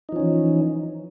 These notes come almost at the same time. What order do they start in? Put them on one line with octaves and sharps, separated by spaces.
D#4 F3 C#4 E3